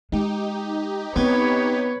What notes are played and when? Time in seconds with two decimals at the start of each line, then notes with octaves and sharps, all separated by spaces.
0.12 G#3 D#4 G4
1.16 B3 C4 B4 C#5